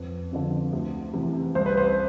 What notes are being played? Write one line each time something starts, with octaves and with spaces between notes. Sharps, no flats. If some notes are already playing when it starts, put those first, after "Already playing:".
Already playing: F2 B4
D3 F3 C4
D2
C3 E3
C2 C5
B4
C5